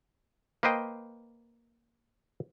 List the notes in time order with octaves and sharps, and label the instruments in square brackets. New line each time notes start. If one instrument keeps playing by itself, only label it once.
[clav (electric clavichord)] A#3 B4 C5 D#5 G5